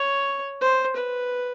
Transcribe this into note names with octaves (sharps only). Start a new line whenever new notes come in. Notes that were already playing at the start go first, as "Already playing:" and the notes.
Already playing: C#5
C5
B4